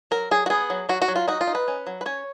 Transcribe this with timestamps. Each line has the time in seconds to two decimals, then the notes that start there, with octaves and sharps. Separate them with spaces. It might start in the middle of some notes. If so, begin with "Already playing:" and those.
0.11 F#3 A#4
0.31 F#3 G#4
0.46 F#4
0.50 B3 G#4
0.70 F#3
0.89 F#3 F#4
1.02 F#4
1.08 F#3
1.16 F4
1.28 D#4 F#4
1.41 F4
1.47 D#4
1.55 B4
1.68 C#4
1.87 F#3
2.01 B4
2.06 C#4 C#5